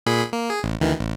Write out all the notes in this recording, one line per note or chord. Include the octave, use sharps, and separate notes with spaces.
A#2 G#4 B5
A#3
G#4
A1
D2 D#3 E3
A1